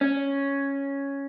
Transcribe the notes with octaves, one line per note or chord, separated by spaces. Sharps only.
C#4